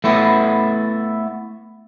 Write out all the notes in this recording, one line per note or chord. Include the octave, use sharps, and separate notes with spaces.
A3 B3 E4